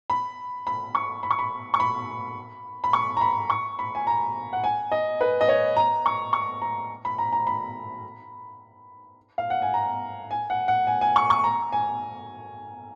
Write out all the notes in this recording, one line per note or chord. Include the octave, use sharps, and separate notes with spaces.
B5
B5
C#6
B5
C#6
B5
C#6
B5
B5
C#6
A#5
B5
C#6
B5
G#5
A#5
F#5
G#5
D#5
B4
D#5
C#5
A#5
C#6
C#6
A#5
B5
A#5
A#5
B5
F5
F#5
G#5
A#5
G#5
F#5
F#5
G#5
G#5
C#6
C#6
A#5
G#5